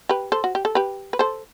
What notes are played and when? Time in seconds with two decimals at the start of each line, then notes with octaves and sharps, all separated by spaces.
0.09 G4 B4
0.32 A4 C5
0.44 F#4
0.55 G4
0.65 A4
0.75 G4 B4
1.13 B4
1.19 A4 C5